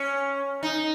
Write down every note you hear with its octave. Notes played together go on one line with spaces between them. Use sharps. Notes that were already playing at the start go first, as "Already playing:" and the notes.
Already playing: C#4
D#4